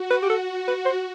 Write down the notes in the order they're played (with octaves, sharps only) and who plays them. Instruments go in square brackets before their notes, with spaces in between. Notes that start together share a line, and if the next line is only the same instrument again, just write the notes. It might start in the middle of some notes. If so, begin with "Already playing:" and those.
Already playing: [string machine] F#4
[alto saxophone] B4
G4
A4
B4
C5